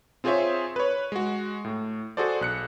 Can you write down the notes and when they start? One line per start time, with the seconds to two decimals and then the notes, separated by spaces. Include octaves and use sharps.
0.24 C4 F4 G#4 C5 C#5 E5
0.76 B4 C#5
1.12 G#3 F#4
1.65 A2
2.17 F#4 G#4 A4 C5 D5
2.41 B1 F#6 C#7